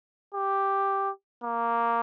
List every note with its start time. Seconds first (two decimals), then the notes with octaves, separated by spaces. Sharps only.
0.35 G4
1.44 A#3